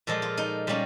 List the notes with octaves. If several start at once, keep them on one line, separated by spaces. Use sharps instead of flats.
A#2 F3 G#3 A4
F4
D#4
A#2 G3 A#3 C#4